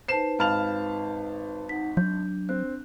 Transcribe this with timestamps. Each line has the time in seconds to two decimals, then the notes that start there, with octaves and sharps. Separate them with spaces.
0.08 D#4 B4 C5 A5 C7 E7
0.39 G#1 F5 A5 B5 F6 F7
1.69 D#4 F#5 B6
1.97 F#3 D4 G6
2.49 C4 F#6